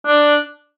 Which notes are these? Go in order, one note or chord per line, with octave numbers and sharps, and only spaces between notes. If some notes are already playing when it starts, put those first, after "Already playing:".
D4